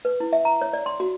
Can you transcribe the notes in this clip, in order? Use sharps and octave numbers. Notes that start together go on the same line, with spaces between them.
B4
E4
E5
A#5
C#5
D5
C6
F#4